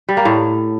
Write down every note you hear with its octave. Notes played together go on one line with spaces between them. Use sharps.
G3
A#3
A2